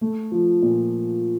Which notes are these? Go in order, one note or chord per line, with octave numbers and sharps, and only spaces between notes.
A3
F3
A#2